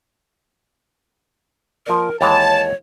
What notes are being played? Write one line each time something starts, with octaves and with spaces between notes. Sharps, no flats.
F3 A#3 A#4 D5
D#2 E3 G#3 C#5 A5